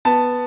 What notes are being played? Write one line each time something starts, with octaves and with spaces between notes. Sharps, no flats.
B3 A5